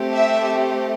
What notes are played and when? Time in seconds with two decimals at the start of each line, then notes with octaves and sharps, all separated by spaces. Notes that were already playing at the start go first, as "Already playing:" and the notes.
Already playing: A3 C4 G4
0.13 E5